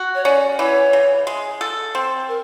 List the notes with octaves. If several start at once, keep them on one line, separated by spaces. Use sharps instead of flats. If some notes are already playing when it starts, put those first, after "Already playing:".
Already playing: F#4
C#5
C#4 D5
E3 C#5
C#3
G#3
A4
C4
A#4